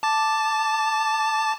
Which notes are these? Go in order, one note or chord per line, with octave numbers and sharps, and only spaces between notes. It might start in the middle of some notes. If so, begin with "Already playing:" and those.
A5 D6 A6